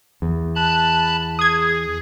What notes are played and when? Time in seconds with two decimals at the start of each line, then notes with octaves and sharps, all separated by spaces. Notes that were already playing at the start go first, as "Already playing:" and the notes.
0.22 E2
0.56 A5 B5 F#6
1.39 G#4 D#6 G#6